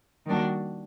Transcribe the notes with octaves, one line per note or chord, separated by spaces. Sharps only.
D#3 G3 A#3 D4 F#4